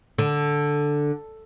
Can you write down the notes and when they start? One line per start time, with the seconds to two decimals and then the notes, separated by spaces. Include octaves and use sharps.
0.18 D3